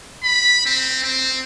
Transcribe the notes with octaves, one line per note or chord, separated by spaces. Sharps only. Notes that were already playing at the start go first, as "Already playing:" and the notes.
B5
C4
C4